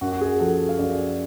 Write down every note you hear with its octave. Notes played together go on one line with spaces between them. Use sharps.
F#2 F#4
F#4
G#4
F3 A4
F5
F#2 D5